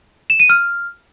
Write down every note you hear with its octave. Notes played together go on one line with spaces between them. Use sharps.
E7
D#7
F6